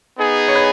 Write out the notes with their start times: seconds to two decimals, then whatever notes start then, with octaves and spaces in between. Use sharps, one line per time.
0.17 B3 D#4 G#4
0.48 C#5
0.55 B4